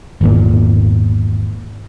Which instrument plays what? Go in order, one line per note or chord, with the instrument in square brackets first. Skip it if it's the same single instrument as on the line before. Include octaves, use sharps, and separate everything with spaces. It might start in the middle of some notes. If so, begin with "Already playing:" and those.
[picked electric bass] G#1 E2 A#2